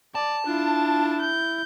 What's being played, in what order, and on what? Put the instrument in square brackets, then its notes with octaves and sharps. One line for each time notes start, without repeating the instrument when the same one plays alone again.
[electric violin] D5 [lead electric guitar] A5
[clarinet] D4 [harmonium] E4 [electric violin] F4
[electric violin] G6